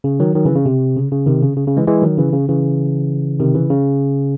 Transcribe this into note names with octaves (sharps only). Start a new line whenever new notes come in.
C#3
D#3 F#3
D#3 F#3
C#3 E3
C#3
C3
C#3
C#3
C3 D#3
C#3
C#3
C#3
E3 G#3
E3 G#3
D#3 F#3
C#3 E3
C#3
C#3 E3
C3 D#3
C#3 E3
C#3